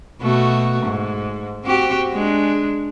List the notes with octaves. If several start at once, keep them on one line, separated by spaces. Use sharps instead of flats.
B2 A3 F#4
G#2
C4 F#4 G4
G#3 D4